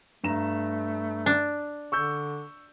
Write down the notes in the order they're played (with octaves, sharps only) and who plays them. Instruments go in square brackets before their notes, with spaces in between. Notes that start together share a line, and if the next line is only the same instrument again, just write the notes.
[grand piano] G2 A#5 E7 [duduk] A3
[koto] D4
[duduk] D3 [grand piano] C#6 E6 G6